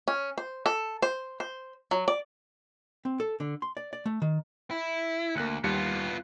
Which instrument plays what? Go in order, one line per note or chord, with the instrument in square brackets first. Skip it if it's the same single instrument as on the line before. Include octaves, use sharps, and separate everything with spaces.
[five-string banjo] C#4
C5
A4
C5
C5
F#3
D5
[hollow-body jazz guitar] C4
A4
D3
C6
D5
D5
A3
D#3
[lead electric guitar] E4
[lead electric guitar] D2 [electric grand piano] A#3 F#6 C#7
[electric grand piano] D#2 G3 C#7 [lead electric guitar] B3 F4